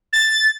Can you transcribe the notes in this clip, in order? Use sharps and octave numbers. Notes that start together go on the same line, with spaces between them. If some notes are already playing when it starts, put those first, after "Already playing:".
A6